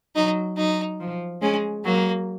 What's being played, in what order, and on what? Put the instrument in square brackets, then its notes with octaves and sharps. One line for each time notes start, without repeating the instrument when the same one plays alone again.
[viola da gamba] F#3 [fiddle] D#4
[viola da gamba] F#3 [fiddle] D#4
[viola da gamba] F3
[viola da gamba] G#3 [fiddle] C#4
[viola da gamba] F#3 [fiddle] A#3